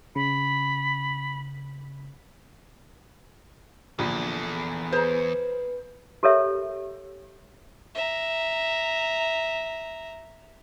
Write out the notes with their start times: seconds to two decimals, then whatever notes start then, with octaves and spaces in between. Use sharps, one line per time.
0.15 C#3 B5
3.99 A#1 E2 D3
4.92 G#4 B4 C5 A#5
6.23 G4 A4 A#4 C#5 E5
7.95 E5 A#5